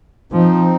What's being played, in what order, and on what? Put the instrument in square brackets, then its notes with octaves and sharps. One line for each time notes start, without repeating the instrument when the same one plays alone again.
[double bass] F3 [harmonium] C4 D#4